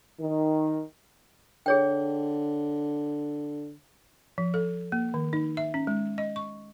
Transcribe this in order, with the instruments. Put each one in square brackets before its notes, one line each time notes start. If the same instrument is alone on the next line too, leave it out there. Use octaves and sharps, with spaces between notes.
[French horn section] D#3
[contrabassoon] D3 [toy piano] G#4 C#5 G5
[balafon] F3
A4
A#3
D#3
D#4
E5
C#4
G#3
D#5
C#6